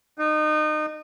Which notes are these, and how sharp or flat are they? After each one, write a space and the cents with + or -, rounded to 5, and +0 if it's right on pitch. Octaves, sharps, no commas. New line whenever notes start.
D#4 -30